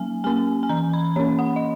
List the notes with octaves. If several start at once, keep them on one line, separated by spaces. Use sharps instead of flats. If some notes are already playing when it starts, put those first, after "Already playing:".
Already playing: F#3 A#3 C#4 G#5
A#3 C#4 G#5
G#5
E3 A#5
B5
A#3 C#4 C#5
F#5
D#5